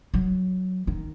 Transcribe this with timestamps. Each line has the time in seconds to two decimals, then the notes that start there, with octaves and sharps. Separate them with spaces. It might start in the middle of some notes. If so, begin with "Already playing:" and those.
0.14 F#3
0.87 D#3